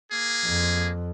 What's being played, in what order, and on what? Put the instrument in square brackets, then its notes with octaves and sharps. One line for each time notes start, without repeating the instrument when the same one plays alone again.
[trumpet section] A#3 G#4
[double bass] F2